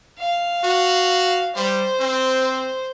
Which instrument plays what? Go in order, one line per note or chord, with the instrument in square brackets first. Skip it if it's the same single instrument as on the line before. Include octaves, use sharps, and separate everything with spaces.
[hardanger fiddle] F5
[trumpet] F#4
[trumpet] G3 [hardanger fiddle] C5
[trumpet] C4